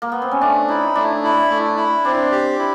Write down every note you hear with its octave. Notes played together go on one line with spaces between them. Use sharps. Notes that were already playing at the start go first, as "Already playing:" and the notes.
A#3
B3
C4
C#4
A3 D4
D#4 E4
A3 D4
E4
A3
E4
C4 D4
G4
E4